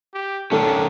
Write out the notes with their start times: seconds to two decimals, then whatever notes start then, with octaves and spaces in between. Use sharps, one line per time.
0.14 G4
0.52 D#3 A3 C#4 D4 A4